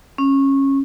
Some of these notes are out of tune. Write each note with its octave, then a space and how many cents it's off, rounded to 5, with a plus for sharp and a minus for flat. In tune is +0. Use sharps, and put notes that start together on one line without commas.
C#4 -20